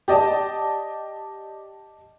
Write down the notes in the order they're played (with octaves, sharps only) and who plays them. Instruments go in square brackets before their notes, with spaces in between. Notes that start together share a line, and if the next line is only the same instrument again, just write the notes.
[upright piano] G4 D5 D#5 A5